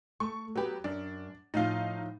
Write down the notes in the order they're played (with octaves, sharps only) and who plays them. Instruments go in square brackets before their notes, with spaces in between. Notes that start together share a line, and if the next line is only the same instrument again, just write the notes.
[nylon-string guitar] A3 [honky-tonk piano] C#6
[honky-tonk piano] F#3 G4 [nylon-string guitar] B3 B4
[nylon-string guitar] F#2 [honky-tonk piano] D4
[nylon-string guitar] A2 F3 F4 [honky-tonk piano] D#4 F5